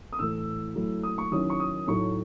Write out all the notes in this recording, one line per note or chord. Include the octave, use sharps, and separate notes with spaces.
D#6
A2 E3 A3 E6
F#3 A3 E4
D#6
C#6
D#3 F#3 C#4 E4 D#6
C#6
D#6
A2 F#3 A3 D#4 C#6